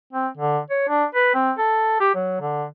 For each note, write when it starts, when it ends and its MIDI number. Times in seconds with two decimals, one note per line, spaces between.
0.13 0.27 60
0.37 0.58 50
0.70 0.85 73
0.88 1.04 62
1.15 1.29 71
1.34 1.52 60
1.58 1.98 69
2.00 2.12 67
2.15 2.40 54
2.41 2.64 50